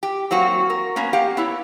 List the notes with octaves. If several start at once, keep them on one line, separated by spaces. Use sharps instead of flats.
G4
F#3 A#3 C4 F#4
A#4
A#3 B3 C#4
G4 F5 F#5
B3 E4 C#5